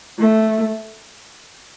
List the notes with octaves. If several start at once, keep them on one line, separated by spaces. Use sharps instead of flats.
A3